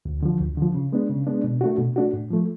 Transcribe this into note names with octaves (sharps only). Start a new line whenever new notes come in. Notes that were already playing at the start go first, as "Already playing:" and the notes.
D2
D3 F3
D2
D3 F3
C#3
G#3 B3 D4
C#3
G#3 B3 D4
B2
A3 D4 F#4
B2
A3 D4 F#4
A2
F3 A3